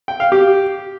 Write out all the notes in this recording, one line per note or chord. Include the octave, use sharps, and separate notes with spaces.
G5
F5
G4